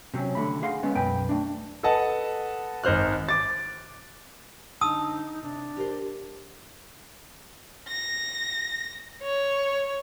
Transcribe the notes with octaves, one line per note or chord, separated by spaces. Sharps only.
C3 F#3 C4 C#4
D3 A3 B5
G#4 F5 F#5 C6
G#3 B3 C#4
B1 F#2 B4 G5
A3 D4
A4 B4 D#5 F#5 A5
G#1 D#4 C5 F6 F#6
D6 A6
D3 D#4 C5 A5 D#6 E6
C3 D4
G4 A#4 C5
A#6
C#5